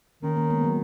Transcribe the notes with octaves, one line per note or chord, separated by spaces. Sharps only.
D#3 A#3 C#4
A#3 C#4
G#3 B3
F#3 A#3